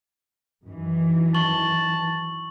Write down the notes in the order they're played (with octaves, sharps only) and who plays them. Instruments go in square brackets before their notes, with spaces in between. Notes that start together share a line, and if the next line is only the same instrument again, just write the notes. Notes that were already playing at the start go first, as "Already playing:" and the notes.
[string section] F#2 D#3 E3
[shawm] A5 [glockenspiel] C#6 F#7